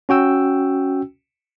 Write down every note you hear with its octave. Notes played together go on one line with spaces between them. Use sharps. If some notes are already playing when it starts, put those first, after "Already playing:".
C#4 F#4 G5 E6